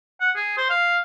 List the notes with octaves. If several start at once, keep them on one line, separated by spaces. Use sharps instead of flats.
F#5
G#4
C5
F5